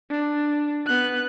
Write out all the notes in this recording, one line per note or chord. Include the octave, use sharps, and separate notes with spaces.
D4
B3 F#6